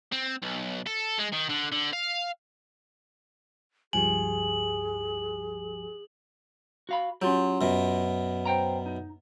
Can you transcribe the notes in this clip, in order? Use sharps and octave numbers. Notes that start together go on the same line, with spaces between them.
C4
B1
A4
G#3
D#3
D3
D3
F5
C#2 G2 F3 G4 G#4 G#5 F#7
F#4 F5 B5
F#3 C#4 F4 G4
F#2 B2
C5 G5 A#5
D#4